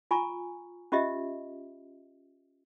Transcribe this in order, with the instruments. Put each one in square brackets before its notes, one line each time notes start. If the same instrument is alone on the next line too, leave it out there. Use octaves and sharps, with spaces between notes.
[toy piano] F4 G#5 A#5 C#6
C#4 F4 G4 D#5 E5